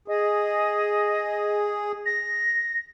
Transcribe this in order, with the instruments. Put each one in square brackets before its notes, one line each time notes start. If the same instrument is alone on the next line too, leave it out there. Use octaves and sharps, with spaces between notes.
[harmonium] G#4 [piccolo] D#5
[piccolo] A#6